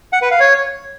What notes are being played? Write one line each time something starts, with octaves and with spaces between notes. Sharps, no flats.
F#5
B4
F5
C#5